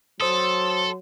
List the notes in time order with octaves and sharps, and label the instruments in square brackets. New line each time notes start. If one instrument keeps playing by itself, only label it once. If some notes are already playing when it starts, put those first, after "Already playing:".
[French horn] F#3 [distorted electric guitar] A4 [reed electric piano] C5 D#6 [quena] C6